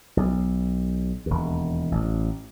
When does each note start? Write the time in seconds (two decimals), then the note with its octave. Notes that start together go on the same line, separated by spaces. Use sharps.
0.17 B1
1.26 E1 D#2
1.92 A1